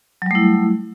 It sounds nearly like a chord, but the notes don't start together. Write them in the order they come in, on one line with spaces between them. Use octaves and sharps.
F#3 G3 A3 E4